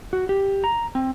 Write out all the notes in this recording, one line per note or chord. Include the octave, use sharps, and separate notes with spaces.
F#4
G4
A#5
C4